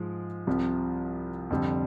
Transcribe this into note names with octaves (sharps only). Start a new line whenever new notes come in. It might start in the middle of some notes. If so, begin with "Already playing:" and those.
Already playing: G#2 F3 G#3
C2 C3 F3
F2 D3 G3